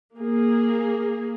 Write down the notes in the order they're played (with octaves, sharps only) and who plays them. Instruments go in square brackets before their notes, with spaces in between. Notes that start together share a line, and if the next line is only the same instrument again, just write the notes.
[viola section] A#3 G#4